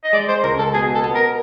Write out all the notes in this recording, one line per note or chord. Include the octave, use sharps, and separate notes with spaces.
D#5
G#3 D5
C5
C#2 A#4
A4
B2 G#4
A4
B3
A#4